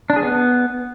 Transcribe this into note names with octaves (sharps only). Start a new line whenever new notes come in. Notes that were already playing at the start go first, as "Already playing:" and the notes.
D4
G#4
B3